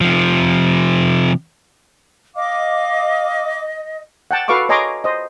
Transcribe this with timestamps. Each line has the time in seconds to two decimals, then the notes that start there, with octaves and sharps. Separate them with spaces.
0.01 C3 F3
2.36 D#5 F5 D6
4.31 F#5 G5 A5
4.48 F#4 A4 B4 F5 C#6 D6
4.69 C#5 D#5 G#5 A#5 C6 D6
5.04 C5 D#5